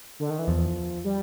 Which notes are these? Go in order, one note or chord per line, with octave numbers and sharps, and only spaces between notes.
D3
D#3
E3
E2 F3
G3